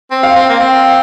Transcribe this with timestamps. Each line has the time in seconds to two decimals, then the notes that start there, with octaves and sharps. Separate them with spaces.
0.11 C4
0.23 F5
0.36 C4
0.49 A#3
0.60 C4